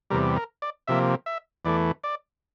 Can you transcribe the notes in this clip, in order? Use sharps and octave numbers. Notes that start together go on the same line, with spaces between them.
E2 C3 G3 A#4
A#4
D5
C3 F3 A#3 E5
E5
E2 E3 A3 D5
D5